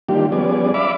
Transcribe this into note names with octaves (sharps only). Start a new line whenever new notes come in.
D#3 G3 A#3 D4 F4 G4
F3 G3 B3 C#4 G#4 D5
D5 E5 F5 B5 D6